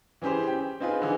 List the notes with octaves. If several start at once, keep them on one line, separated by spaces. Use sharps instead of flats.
E3 C#4 G4 G#4 C5
G5
C4 D#4 F4 G#4 B4
D3 E3 D#4 G#4